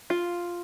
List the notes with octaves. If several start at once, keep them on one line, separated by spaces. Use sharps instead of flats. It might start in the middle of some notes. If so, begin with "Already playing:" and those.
F4